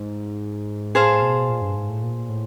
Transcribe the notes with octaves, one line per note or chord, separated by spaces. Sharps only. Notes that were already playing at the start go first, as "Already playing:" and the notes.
Already playing: G#2
A2 G#4 C5 F5 A5
B2
A#2
G2
G#2
A2
A#2
A2